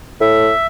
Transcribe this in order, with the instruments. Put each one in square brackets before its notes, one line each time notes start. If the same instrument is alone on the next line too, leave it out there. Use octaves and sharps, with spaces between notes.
[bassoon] A2 [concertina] E5